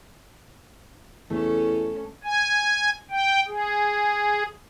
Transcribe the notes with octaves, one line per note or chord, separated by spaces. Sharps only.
E2 A3 C#4 A4
G#5
G5
G#4